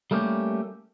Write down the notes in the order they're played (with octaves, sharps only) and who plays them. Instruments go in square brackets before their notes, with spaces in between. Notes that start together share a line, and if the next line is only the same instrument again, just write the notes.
[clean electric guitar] G3 A3 A#3 C#4 G4